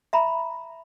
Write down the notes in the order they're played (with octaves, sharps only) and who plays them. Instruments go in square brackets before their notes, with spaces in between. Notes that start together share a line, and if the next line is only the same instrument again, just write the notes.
[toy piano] E5 A#5 B5